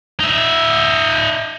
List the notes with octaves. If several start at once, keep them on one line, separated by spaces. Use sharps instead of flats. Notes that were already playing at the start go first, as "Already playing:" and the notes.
D#4 E5